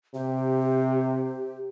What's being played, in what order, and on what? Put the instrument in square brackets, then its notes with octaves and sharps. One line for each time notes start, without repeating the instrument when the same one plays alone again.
[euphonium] C3 [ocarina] G4